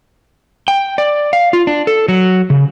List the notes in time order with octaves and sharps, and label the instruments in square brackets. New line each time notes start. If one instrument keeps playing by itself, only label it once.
[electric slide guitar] G5
D5
F5
F4
D4
A4
F#3
C#3